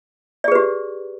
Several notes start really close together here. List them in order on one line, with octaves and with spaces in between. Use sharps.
D5 G#4 B4 G4